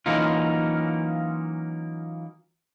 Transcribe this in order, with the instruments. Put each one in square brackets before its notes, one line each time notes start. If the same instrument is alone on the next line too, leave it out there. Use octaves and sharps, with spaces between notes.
[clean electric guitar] E3 F#3 A#3 C#4 D#4 F4